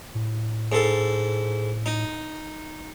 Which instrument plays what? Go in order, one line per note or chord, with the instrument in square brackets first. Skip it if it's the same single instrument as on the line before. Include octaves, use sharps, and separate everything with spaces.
[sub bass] A2
[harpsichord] G#2 A4
D#4